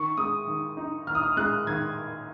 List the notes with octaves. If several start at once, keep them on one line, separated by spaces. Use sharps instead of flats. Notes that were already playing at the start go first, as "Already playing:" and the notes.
Already playing: D#3 C#6
G#3 D#6
D#3
D#4
D#3 F6
D#6
F6
G#3 F#6
D#3 G#6